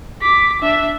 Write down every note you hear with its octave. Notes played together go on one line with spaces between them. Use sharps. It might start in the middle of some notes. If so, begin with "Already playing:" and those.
D6 B6
D4 E5